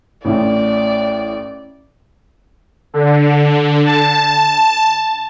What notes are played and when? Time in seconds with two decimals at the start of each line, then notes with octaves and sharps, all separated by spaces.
0.25 A1 A2 D5
2.94 D3
3.85 A5